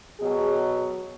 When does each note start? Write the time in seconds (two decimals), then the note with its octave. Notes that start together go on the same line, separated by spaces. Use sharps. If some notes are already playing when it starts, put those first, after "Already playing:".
0.20 B2 F#3 G#4